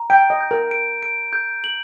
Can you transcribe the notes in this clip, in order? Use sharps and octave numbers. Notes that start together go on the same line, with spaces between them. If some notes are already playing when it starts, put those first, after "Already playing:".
Already playing: A#5
G5 D7
D#5
G6
A#4
D7
D7
G6
F#7